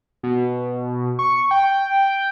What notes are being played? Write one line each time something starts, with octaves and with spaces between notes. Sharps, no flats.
B2
C#6
G5